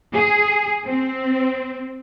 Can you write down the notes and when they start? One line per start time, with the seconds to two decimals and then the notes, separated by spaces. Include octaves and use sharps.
0.13 G#4
0.87 C4